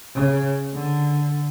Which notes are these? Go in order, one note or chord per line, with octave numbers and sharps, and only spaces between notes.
C#3
D3